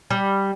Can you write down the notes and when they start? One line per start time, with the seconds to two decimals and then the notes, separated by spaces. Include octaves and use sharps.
0.10 G3